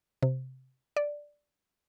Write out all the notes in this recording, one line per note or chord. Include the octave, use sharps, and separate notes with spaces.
C3
D5